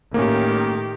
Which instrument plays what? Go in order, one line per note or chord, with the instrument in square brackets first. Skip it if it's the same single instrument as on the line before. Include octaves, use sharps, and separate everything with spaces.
[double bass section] A2 [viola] D#3 G4 [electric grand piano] A#3 C#4